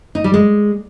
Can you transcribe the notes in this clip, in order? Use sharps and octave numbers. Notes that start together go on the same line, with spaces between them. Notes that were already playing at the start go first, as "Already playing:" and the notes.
D#4
G3
G#3